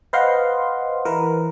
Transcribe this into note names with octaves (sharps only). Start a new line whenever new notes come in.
B4 C5 D#5 F5 F#5 C6
E3 A#4 B4